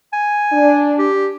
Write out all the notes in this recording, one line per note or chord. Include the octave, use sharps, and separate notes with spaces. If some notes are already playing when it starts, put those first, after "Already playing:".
G#5
D4
G4